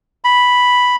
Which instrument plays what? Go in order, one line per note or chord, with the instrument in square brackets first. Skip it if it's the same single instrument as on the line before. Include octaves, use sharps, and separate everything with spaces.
[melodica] B5